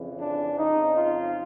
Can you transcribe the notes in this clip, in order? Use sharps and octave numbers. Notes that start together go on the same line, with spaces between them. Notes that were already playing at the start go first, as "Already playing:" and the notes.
Already playing: F2 C#3 E3
D4
F2 C#3 F3 D#4
F4